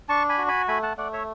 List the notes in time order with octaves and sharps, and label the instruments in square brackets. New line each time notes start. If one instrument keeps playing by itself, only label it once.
[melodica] D4 A5 C#6
G#5 B5
F#4
G#5 B5
A3 G#5 B5
F#5 A5
A3 D5 F#5
C#5 E5